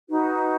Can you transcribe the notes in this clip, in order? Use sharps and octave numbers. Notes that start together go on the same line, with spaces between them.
D#4 F#4 B4